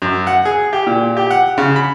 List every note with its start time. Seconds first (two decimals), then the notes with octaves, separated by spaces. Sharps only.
0.02 F#2
0.27 F#5
0.45 G#4
0.73 G4
0.87 A#2
1.17 G4
1.31 F#5
1.58 C#3
1.76 B5